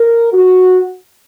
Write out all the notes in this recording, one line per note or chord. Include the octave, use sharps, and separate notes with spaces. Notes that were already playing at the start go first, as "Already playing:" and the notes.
Already playing: A#4
F#4